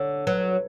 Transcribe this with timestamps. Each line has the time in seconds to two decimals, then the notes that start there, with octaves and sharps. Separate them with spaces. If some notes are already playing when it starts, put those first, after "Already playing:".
Already playing: D3 C#5
0.27 F#3 B4